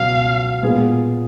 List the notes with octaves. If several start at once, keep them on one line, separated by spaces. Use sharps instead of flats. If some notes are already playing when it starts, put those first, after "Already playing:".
Already playing: C#2 B2 F#3 F5
A#2 G#3 B3 F4 G#4